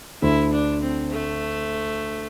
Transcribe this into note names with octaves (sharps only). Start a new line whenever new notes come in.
D2 D3 E4
D4
C4
A3